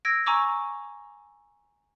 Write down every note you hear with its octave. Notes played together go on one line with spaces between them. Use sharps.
E6 G#6 A#6 D7
G#5 A#5 C#6 D6 E6